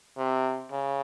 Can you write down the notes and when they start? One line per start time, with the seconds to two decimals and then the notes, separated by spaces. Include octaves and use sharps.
0.17 C3
0.72 C#3